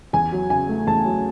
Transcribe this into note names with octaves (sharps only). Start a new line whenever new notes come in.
E2 G#5
F#3
C#3 G#5
A3
E2 A5
F#3